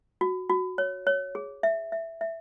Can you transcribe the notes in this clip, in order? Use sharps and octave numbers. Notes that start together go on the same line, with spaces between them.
F#4
F#4
C#5
C#5
G#4
E5
E5
E5